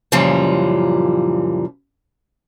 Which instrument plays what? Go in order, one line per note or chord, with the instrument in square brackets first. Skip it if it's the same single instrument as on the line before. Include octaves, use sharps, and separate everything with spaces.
[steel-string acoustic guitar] F#2 A#2 C#3 E3 F3 G3